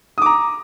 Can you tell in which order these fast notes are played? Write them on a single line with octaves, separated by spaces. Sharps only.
D#6 D6 A#5